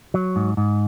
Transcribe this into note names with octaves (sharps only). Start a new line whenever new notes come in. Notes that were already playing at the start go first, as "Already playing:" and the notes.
F#3
G#2
G#2